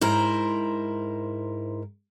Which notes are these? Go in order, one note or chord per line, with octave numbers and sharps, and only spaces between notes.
G#2 E4 A#4 C5